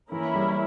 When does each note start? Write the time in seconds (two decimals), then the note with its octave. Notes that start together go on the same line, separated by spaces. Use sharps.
0.11 E3 A#3 C#4 E4 A#4
0.35 G3